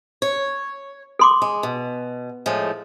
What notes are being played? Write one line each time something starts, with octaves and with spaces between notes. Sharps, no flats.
C#5
A4 C6 D6
G#3
B2
A2 F3 G#3